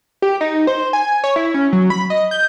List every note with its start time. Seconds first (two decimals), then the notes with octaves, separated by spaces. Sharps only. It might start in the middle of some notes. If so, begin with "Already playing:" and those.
0.22 G4
0.41 D#4
0.67 C5
0.93 G#5
1.24 C#5
1.36 E4
1.54 C#4
1.73 F#3
1.90 B5
2.10 D#5
2.31 G6